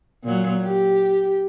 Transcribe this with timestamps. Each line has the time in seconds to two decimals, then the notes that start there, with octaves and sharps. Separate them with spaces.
0.23 A#2 F#3
0.64 G4